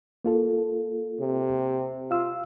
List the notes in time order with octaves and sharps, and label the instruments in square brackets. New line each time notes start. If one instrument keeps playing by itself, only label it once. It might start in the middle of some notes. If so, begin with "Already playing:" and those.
[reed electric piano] A#3 F4 A4
[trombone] C3
[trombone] F4 [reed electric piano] F5 E6